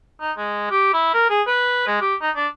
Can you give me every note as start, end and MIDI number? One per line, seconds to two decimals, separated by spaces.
0.21 0.32 63
0.37 0.68 56
0.71 0.93 67
0.94 1.11 64
1.14 1.25 70
1.30 1.42 68
1.47 1.83 71
1.87 1.99 56
2.01 2.15 67
2.21 2.30 63
2.36 2.48 62